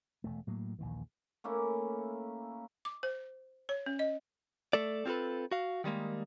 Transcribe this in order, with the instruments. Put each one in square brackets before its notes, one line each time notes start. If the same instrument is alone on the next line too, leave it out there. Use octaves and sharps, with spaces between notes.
[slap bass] E1 A3
A2 F#3 A#3
A#1 D#2 E3
[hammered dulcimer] A3 A#3 C#4 E4
[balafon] D6
C5
C#5
C#4
D#5
[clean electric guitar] A3 A4 D5
C4 F4 G4 A4 B4
F#4 F5
D#3 G3 G#3 A#3